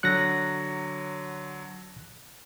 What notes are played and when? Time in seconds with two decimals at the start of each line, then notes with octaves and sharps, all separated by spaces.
0.03 D3 F#3 F#6 A#6 C#7